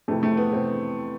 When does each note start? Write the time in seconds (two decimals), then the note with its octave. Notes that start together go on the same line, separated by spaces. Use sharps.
0.08 F2 C3 E3 A3
0.23 A3
0.37 B3
0.52 C3 E3 C4